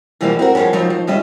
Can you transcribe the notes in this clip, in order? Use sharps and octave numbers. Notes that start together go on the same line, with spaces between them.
B2 E3 F3 G3 G#3 A#3
C4 F#4 A#4
F3 G#3 A#3 B3 C#4
F3 F#3 D#4
F3
D#2 C#3 G3 F4 D#5 E5